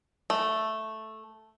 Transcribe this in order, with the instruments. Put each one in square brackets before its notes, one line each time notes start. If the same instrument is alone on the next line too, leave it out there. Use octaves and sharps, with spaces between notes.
[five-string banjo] A3